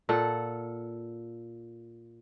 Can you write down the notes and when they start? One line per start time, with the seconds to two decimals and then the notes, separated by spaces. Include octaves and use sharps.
0.09 A#2 A4 F#5